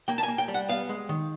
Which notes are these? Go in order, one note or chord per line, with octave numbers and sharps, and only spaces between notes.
A#3 G5
A5
G#5
A#3
G5
G3
F#5
B3 F5
G#3
D#3